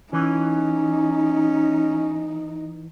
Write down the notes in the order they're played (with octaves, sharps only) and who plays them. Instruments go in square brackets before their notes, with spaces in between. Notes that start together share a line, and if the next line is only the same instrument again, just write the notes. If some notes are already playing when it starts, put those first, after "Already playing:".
[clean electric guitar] E3 [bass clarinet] C#4 [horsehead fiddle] D#4